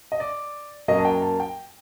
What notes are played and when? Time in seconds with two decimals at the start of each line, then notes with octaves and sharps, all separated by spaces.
0.12 D#5
0.20 D5
0.88 F#2 F#3 A#3 D#5
0.99 A5
1.05 G5
1.22 A5
1.40 G5